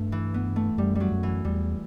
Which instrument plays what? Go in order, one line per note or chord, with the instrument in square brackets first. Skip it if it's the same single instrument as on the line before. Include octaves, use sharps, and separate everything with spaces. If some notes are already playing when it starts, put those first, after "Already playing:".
Already playing: [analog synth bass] G2 [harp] A3
[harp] E3
B3
A3
[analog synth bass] F#2 [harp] G3
[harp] F#3 G3
[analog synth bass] F#2
[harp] E3
[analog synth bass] E2 [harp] G3